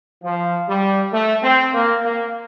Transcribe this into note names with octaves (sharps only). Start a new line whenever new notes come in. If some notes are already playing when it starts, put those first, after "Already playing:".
F3
G3
A3
C4
A#3
A#3